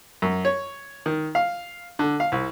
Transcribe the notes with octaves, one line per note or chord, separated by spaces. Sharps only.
F#2
C#5
D#3
F5
D3
F5
C2